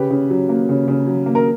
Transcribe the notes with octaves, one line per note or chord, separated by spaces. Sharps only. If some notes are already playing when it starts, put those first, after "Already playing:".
Already playing: C#3 G4 B4
C#3
F#3
A#3
C#3
C#3
F#3
A#3
A#4